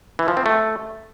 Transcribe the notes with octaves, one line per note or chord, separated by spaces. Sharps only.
E3
F3
C4
A3